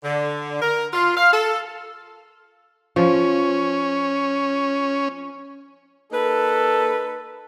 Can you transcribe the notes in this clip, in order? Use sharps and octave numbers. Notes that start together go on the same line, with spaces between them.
D3
A#4
F4
F5
A4
F3 C#4
A#3 D#4 A4 B4